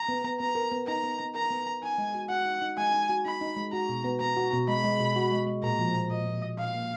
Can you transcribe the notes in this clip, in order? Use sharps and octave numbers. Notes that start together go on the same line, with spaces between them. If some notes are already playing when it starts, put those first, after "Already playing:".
Already playing: A#5
B3
B3
B3 A#5
A#4
B3
D#4 A#5
B3
B3
A#4 A#5
B3
A#4
D#4 G#5
G#3
F#4
F#4 F#5
D#4
D#4
G#3 G#5
D#4
F#4
D#4 B5
D#4
G#3
F#4 A#5
B2
B3
B3 A#5
F#4
B2
G#3 B5
G#3
B2
F#4
G#3
G#3
A#2 A#5
F3
A#2
A#2 D#5
A#2
A#2
A#2 F5
A#3